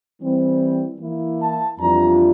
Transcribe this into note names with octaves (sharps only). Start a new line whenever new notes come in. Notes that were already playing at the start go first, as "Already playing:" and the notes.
E3 G3 C4
E3 A#3 E4
A5
F2 E3 G3 D4 F4 A#5